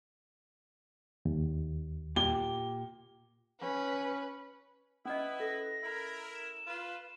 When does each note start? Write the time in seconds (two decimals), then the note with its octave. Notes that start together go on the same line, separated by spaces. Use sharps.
1.25 D#2
2.16 A#2 G4 G7
3.61 C#4 B4
5.05 C#4 E4 B4 D#5 D#6
5.40 A4 A#6
5.83 E4 A#4
6.34 E7
6.67 F4 B4